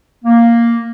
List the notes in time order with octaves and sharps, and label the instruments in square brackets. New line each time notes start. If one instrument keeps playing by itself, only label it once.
[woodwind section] A#3